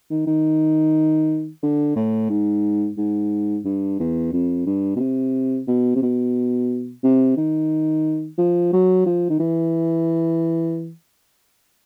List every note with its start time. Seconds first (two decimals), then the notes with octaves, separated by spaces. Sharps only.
0.10 D#3
0.27 D#3
1.63 D3
1.96 A2
2.30 G#2
2.97 G#2
3.65 G2
4.00 E2
4.33 F2
4.66 G2
4.96 B2
5.00 C3
5.67 B2
5.96 C3
6.02 B2
7.03 C3
7.37 D#3
8.38 F3
8.73 F#3
9.06 F3
9.30 D#3
9.39 E3